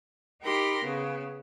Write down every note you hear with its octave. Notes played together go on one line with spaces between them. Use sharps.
D#4 G4 A#4 B5 C6 A#6
C#3 B3